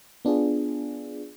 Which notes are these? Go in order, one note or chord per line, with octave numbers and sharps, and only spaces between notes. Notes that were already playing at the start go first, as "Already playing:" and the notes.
B3 D4 F4 G#4